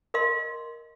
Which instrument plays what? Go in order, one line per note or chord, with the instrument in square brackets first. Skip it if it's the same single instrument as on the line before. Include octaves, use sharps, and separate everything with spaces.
[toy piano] A#4 D#5 F5 C6